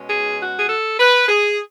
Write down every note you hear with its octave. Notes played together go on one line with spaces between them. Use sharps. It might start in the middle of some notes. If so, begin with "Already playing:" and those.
Already playing: B2 G#3 C#4
G#4
F#4
G#4
A4
B4
G#4